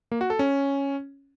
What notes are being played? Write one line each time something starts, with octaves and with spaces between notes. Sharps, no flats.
A#3
F#4
A4
C#4